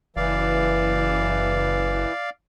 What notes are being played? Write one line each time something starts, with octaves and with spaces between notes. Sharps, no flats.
F#1 E3 D5 F5